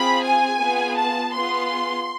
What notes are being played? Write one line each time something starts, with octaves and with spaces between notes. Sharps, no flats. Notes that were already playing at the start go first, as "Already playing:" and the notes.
Already playing: C4 F4 G#4 B5
G#5
B3 F4 G#4
A5
B3 F4 G#4 C6